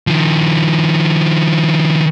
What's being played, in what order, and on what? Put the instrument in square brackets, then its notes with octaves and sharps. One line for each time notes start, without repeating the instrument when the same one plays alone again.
[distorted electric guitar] D#3 F3